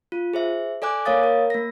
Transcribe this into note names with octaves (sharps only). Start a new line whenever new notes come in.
F4
G#4 C5 E5
A4 D5 G#5 D6 F#6
A#3 A#4 C#5 F5 D#6 A6
A#4
A#3 A#6